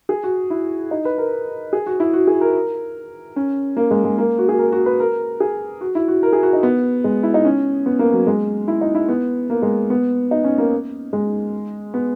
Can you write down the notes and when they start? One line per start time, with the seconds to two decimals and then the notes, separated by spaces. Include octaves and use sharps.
0.09 G#4
0.24 F#4
0.50 E4
0.91 D#4
1.05 B4
1.18 A#4
1.73 G#4
1.86 F#4
2.00 E4
2.13 F#4
2.27 G#4
2.41 A#4
3.36 C#4
3.77 A#3
3.91 G#3
4.04 G#3
4.18 A#3
4.38 F#4
4.49 G#4
4.59 A#4
4.72 F#4
4.86 B4
5.00 A#4
5.40 G#4
5.81 F#4
5.95 E4
6.08 F#4
6.23 A#4
6.33 G#4
6.43 F#4
6.53 D#4
6.63 B3
7.04 G#3
7.23 E4
7.34 D#4
7.45 C#4
7.86 B3
7.99 A#3
8.13 F#3
8.27 G#3
8.68 E4
8.81 D#4
8.95 E4
9.09 B3
9.50 A#3
9.62 G#3
9.90 B3
10.31 D#4
10.44 C#4
10.58 A#3
11.13 G#3
11.94 B3